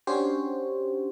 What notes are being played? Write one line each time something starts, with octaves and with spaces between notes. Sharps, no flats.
C#4 D4 F#4 G4 C5 C#5